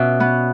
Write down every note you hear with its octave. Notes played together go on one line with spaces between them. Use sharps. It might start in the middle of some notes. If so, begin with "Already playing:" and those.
Already playing: B2 C#4 D5 E5
B3